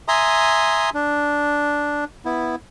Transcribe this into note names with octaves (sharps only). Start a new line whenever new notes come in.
E5 G#5 A#5 C6 D#6
D4
B3 E4